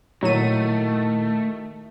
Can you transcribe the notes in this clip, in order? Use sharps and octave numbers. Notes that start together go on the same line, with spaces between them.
A#2 D#3 F#3 A3 E4 F#4 D#7